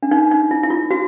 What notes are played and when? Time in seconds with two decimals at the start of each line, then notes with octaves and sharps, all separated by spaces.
0.03 D4
0.11 D#4
0.32 D#4
0.51 E4
0.63 E4
0.70 F4
0.91 F#4